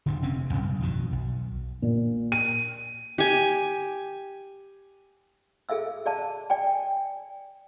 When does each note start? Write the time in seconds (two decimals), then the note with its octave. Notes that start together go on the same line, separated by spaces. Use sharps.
0.06 D#1 G2 D3
0.22 F1 C4 C#4
0.53 B1 G2 C#3
0.80 F2 B2 D#3
1.12 B1
1.82 A#2
2.32 D#7
3.18 G4 G#5
5.69 G#4 A4 E5 F5 E6
6.06 G#4 D5 F5 A5
6.50 D5 G5 G#5